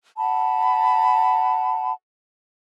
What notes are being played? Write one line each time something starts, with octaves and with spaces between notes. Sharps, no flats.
F#5 A5 B5